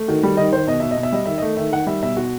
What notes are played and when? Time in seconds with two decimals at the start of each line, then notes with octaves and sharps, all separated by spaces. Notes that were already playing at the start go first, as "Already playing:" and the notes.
Already playing: A3
0.08 D#3 F#4
0.23 G3
0.37 D#3 D#5
0.53 D#3 C5
0.67 B2 D#5
0.80 B2 E5
0.91 D#5
0.97 B2
1.03 E5
1.12 G3 D#5
1.26 D#3 E5
1.38 A3 D#5
1.57 D#3 E5
1.72 D#3 F#5
1.87 G3 E5
2.03 B2 E5
2.17 B2 F#4